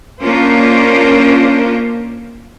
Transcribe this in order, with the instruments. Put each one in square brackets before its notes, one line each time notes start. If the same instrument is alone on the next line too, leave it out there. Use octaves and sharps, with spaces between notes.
[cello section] A#3 C#4 D4 F4 A#4 C5